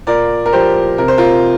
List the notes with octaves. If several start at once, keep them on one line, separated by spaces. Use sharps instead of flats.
A#2 A#4 D5
A#4
F3 G4 C5
C3 A#4
C5
F4 A#4